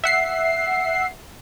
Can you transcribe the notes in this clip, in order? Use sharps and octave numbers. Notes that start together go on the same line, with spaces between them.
E5 F#5 C7